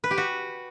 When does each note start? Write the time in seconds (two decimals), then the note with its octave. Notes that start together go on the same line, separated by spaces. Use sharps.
0.04 B4
0.11 G4
0.18 F#4